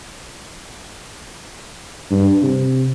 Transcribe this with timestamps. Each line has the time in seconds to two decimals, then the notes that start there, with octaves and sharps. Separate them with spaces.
2.11 G2
2.42 C3